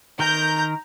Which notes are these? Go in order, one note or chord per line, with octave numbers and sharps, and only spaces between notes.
D#3 A#4 A#5 G6